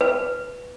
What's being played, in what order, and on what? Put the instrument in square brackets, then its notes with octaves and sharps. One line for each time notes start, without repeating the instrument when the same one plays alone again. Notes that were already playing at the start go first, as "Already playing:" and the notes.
[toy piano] B4